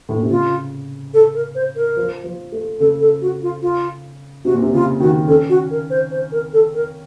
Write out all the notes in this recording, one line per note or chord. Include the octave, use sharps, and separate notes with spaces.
A2
A#2
C3
C#3 F4
A4
A#4
C5
A#4
F3
F3
A3
C#3 A4
A4
F#4
F4
F4
C3 F#4
A#2
C3
C#3 F4
D#3 F#4
C#4 A4
F#4
A#4
C5
C5
A#4
A4
A#4